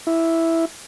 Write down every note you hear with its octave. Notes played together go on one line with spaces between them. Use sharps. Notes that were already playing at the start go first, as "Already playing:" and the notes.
E4